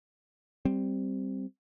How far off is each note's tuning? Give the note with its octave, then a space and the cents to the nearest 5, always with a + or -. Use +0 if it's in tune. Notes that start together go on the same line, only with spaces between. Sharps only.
G3 +0 C4 +0